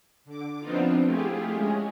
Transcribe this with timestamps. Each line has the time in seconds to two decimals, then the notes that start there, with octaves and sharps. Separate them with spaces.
0.25 D3 D6
0.60 F3 B3 C4 D4 D#4 F4
1.04 A3 E4 F4 G4 G#4
1.51 G#3 C#4 G#4